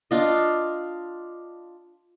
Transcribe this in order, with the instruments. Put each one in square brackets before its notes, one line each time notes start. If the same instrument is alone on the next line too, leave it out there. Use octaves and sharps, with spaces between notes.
[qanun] D4 F4 D#5